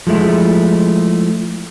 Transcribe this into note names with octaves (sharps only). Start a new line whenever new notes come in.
F3 G#3 A3 E4